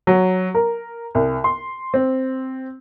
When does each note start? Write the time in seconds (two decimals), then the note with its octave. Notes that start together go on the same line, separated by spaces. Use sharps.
0.07 F#3
0.55 A#4
1.15 C2
1.44 C6
1.94 C4